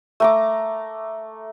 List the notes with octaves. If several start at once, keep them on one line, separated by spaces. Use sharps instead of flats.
A3 A#5 D6